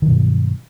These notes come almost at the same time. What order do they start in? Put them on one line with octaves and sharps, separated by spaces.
D#3 F#3 B2 G2